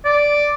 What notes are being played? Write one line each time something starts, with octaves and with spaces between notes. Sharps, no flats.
D5